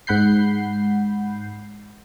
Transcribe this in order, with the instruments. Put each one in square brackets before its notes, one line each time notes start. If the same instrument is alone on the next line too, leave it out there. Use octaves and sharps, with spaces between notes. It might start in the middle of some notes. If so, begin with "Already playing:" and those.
[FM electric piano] G#2 F#5 B5 G6 C7